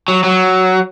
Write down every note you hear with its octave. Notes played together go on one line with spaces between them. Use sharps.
F#3
F#3